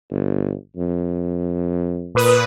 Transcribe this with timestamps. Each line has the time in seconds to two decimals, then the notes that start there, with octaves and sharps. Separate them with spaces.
0.11 G1
0.77 F2
2.15 A#2 B4 D#6